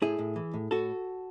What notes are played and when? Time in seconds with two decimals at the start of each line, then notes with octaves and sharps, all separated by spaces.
0.02 A2 E4 G#4
0.19 A2
0.36 E3
0.54 A2
0.71 A2 F#4 A4